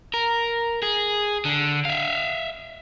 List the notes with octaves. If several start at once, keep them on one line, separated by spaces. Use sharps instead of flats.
A#4
G#4
D3
E5 F5